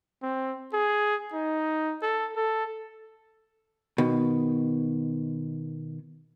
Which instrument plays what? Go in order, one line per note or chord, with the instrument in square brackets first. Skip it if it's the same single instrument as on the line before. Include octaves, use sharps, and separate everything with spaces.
[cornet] C4
G#4
D#4
A4
A4
[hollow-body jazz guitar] B2 D#3